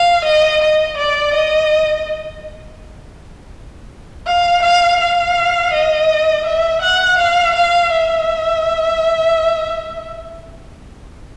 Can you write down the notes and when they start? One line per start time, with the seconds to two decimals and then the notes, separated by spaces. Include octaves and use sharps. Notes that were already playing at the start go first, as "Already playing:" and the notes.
Already playing: F5
0.24 D#5
0.61 D#5
0.97 D5
1.34 D#5
4.26 F5
4.62 F5
5.00 F5
5.73 D#5
6.46 E5
6.81 F#5
7.18 F5
7.55 F5
7.92 E5